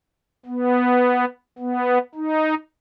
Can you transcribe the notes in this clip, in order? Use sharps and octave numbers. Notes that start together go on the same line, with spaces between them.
B3
B3
D#4